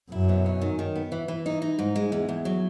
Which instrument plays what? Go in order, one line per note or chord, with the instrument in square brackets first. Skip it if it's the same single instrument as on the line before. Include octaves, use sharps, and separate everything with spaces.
[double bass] F#2 [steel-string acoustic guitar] E4
[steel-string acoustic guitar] B2
C#4
D#3
D#3
B3
E3
E3
D#4
D#4
G#2
G#3
E2
E2
F#3